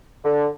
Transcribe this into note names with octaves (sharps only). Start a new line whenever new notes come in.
D3